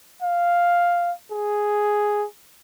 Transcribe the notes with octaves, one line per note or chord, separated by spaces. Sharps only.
F5
G#4